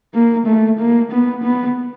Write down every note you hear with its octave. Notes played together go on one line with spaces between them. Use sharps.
A#3
A3
A#3
B3
B3